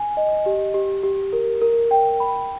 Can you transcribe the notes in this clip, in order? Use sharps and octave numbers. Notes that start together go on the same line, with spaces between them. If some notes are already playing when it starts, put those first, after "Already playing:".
Already playing: G#5
D#5
G4
G4
G4
A#4
A#4
G5
B5